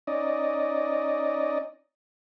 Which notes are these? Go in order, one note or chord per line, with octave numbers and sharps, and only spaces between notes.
C#4 D#4 D5 D#5